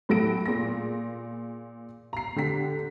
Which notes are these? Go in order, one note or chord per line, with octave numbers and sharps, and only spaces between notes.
A2 F#3 A4 A#6 D7
A#2 G#4 A#6
A#5 C7
D3 G4 B6